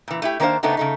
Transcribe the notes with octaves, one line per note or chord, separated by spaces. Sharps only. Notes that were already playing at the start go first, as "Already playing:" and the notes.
A#2 E3
A3 E4 G4
D#3 A#3 D4 A#4 C5 F5
C#3 A3 B3 C4 D4 D#4
C#3 A3 D#4